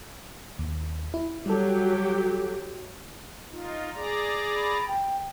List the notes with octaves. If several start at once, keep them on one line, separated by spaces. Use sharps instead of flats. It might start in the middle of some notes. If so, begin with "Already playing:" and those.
D#2
E4
F#3 G3 G4 A4
D#4 F4
G#4 D5 A#5
B5
G5